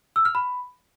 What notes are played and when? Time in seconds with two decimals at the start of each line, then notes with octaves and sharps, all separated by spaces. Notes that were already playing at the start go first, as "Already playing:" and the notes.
0.16 E6
0.25 F6
0.35 B5